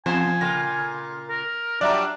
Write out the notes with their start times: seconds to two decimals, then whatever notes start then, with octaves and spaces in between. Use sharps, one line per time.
0.06 E2 C3 F3 C5 G#5
0.41 A#2 C#3 F4 A#6
1.29 A#4
1.81 F#3 G3 D4 F4 D5 E5 A#5